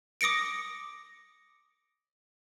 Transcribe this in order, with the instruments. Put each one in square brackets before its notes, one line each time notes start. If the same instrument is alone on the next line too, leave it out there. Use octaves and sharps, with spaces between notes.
[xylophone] D6 D#6 A#6 C#7 D7